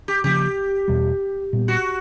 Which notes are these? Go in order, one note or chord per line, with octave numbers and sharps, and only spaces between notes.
G4
C#3 F3 A#3 G4
E2 B2 G3
A#2 G3 B3
F#4